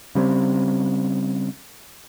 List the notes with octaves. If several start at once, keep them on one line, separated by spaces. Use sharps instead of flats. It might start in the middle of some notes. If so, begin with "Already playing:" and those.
C#3 G3 B3 C4